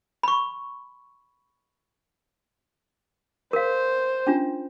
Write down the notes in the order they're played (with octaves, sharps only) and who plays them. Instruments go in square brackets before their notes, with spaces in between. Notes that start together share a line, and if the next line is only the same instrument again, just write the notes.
[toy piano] B5 C#6
[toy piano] A#4 F5 [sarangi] C5
[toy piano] C#4 D4 F4